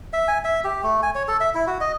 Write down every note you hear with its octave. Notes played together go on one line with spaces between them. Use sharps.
E5
G#5
E5
G4
A3
G#5
C#5
A4
E5
E4
F#4
D#5